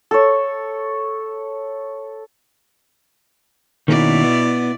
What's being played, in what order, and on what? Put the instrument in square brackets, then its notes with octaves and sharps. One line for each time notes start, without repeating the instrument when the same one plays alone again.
[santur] A4 C#5
[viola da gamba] B2 E4 D5 [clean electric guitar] D#3 A#3 C#4
[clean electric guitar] B3